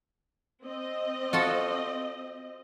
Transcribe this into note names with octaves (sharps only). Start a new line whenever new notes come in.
C4 D#5
F4 F#4 A4